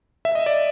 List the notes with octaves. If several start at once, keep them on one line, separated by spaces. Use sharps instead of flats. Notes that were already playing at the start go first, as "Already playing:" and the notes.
E5
D#5
D5